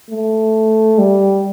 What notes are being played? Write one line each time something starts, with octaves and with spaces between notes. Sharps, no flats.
A3
G3